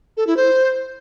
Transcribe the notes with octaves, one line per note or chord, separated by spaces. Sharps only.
A4
E4
C5